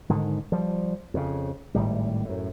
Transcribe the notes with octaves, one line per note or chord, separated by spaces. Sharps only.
G#2 D3 D#3
F3 G3
F2 C#3
G#1 A2 G3
F#2 A2